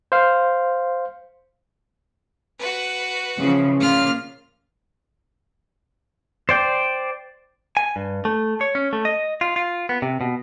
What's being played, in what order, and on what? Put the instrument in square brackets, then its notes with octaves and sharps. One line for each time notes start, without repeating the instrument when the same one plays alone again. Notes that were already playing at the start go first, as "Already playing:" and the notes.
[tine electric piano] C5 F5
[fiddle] F#4 B4
[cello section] C#3 E3 F3
[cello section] A#2 C#3 A#3 [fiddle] F4 F6
[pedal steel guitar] C5 D5 G5
[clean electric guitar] G#5
G2
A3
C#5
C#4
A3
D#5
F4
F4
B3
C3
B2